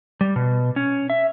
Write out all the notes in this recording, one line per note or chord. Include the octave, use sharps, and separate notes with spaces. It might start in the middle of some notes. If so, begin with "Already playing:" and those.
G3
B2
C#4
E5